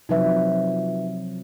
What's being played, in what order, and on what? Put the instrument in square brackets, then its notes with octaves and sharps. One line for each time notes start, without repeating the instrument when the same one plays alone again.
[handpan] C3 F3 F#3 [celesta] D#4 B4 E5